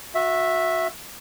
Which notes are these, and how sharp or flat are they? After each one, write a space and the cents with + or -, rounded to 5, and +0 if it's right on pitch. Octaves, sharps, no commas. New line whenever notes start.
F#4 -25 E5 +0